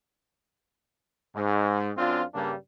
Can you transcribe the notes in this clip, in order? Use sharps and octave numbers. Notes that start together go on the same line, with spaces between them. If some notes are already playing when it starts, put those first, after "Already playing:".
G#2
F#2 C4 D4 F4
G2 C#3 G3 A#3 D4